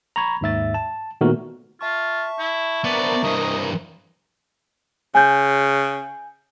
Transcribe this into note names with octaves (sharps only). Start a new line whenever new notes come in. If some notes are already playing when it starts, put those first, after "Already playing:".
A#5 B5 C#6 G#6
D#2 G#2 E5 A6
A5
A#2 D#3 A3 B3 F#4 A#4
F4 E5 A5 C#6
E4
B3 D4 A#4 C5 D5
G2 E3 D#5
C#3 G#5 G6